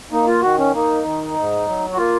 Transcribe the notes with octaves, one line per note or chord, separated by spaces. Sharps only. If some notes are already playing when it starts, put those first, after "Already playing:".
A#3 D#4
F4
D#3 F#4
C#4
A#3 D#4
D#3
G#2
F#3
F#4
A#3 F4